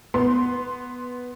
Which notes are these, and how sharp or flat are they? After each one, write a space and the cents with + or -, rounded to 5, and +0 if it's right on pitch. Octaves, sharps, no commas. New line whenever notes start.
B3 +0 C6 +0